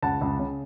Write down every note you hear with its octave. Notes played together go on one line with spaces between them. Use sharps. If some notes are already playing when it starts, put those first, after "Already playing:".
C#2 F#5 A5
C#2
C#3